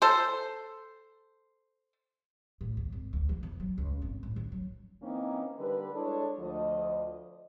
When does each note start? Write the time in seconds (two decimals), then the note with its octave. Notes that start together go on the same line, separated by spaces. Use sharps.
0.02 A4 C5
2.61 A2
2.77 D#2
2.92 G#1
3.13 D2
3.29 F3
3.43 E2
3.60 F#3
3.78 C#2
4.02 G#1
4.23 A1
4.36 D#3
4.52 F#3
5.03 E3 A#3 C4 C#4 D#4
5.58 D3 G3 A#4 B4
5.94 G#3 D4 E4 A4 C#5
6.40 D2 F3 D#5